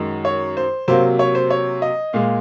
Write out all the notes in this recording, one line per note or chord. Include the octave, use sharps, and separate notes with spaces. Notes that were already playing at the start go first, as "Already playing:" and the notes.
Already playing: F#2 D#3 G#3
C#5
C5
C3 F#3 A#3 C5
C#5
C5
C#5
D#5
A#2 G#3 F5